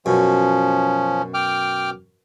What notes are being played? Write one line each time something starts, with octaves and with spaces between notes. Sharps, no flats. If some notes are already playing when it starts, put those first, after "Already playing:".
F#2 B2 F3 C#4
G5 D6 F6